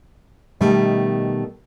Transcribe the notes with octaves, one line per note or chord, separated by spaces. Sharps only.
B2 D#3 G3 A3